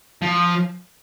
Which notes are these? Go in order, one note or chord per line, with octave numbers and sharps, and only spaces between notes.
F3